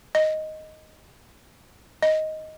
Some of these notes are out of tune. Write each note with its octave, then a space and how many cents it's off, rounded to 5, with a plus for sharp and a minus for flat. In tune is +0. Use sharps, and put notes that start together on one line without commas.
D#5 +0
D#5 +5